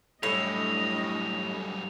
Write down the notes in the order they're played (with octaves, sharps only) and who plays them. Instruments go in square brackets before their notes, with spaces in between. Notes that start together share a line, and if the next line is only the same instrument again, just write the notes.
[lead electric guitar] F#2 G3 [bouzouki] A2 [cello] D4 D#5 [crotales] F7